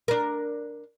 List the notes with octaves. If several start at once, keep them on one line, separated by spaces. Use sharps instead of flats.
D4 A#4